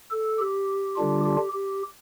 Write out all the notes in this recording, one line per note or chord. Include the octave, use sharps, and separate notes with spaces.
A4
G4
D3 G3 D4 F4
G4
G4